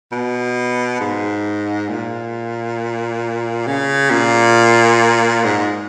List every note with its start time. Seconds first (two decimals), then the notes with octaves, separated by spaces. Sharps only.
0.12 B2
1.01 G#2
1.89 A#2
3.67 C#3
4.11 A#2
5.44 G#2